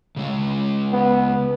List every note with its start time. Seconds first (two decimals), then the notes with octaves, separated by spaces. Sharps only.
0.16 C#3 G#3
0.93 B3